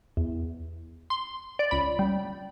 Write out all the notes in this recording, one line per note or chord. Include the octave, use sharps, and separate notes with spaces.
E2
C6
D5
C#2 B5
G3